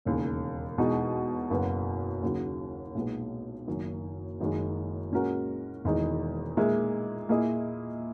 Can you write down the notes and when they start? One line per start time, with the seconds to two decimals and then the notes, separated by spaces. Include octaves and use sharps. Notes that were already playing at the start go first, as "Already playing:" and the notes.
0.05 E1 D#2 C#3
0.78 E2 B2 G#3 D#4
1.50 F#1 F#2 C#3 F#3 B3
2.22 D#2 C#3 F#3
2.95 B1 A#2 G#3 B3
3.68 F#1 F#2 D#3
4.40 F#1 F#2 D#3 G#3
5.11 A#2 G#3 C#4 F#4 A#4
5.84 E1 E2 D#3 G#3 D#4
6.57 A#2 G#3 D#4 A#4 E5
7.29 A#2 A#3 E4 G#4 D#5